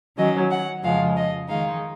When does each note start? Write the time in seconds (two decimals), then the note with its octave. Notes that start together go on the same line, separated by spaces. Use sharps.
0.17 D#3 F#3 C#4 D#5
0.51 F#5
0.83 F2 C#3 F3 G#3 F5
1.16 D#5
1.48 D#3 G#3 D#4 F5